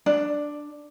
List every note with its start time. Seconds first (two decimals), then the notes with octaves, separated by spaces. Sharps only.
0.06 D4